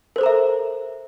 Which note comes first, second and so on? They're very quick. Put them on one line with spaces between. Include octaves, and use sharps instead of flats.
A#4 C5 A4 A#5 E5